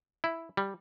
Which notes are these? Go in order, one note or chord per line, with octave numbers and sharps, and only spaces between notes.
E4
G3